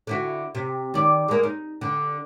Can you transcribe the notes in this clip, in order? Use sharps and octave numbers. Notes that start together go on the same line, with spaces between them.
D3 E4 F#4
C3
D#3 D5
G#3 A#3
D#4
D3